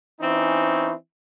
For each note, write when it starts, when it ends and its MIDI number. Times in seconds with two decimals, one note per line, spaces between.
0.21 0.93 52
0.21 0.93 60
0.21 0.93 61
0.21 0.93 63